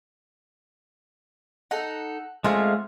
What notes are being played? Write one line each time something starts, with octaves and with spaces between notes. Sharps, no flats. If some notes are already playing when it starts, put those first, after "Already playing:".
D#4 A4 F#5
G#3 A3 C4 C#4 F4 F5